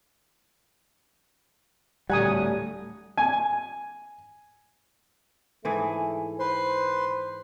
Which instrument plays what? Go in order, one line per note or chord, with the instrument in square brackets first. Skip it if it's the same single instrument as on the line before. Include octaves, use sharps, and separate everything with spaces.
[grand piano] D1 A#5 G#6 [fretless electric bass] G3 [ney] A3 [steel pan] F#5 G#5 D#6
[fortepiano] G#5
[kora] G#2 E3 G#4 [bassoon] A3
[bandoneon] B4 C6 [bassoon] C5